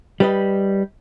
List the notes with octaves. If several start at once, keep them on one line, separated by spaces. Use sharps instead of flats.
G3 B4 D#5